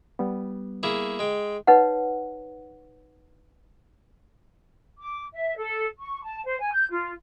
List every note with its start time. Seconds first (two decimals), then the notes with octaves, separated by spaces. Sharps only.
0.19 G3 B3
0.83 A#3 E4 G#4
1.19 G#3 G5
1.67 D#4 B4 C#5 F#5
4.98 D6
5.33 E5
5.57 A4
5.98 C#6
6.23 A5
6.45 C5
6.60 G#5
6.72 G6
6.90 F4